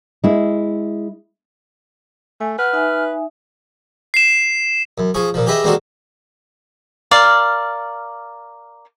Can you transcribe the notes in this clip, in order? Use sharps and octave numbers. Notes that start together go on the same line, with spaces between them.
G#3 E4
A3 G#5
B4 F#5 F6
D#4 E5 G#5
C7 E7
F#2
F3 G#4 C#6
A#2 F3
G4 G#4 B4 D#5 E5
G#3 A#3 C4 D4 F#4 A4
A#4 D5 F5